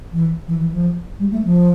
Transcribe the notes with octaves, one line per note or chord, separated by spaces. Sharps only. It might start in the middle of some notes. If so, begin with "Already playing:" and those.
E3
E3
E3
F3
G3
A3
F3